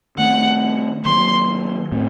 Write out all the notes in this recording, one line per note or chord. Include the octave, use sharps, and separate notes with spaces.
D#3 A3 C4 F#5
D#3 F#3 A#3 C6
A2 A3 C4